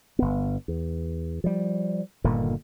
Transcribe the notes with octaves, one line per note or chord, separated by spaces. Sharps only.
G1 B3
E2
F3 G3
G1 A#2 D3 D#3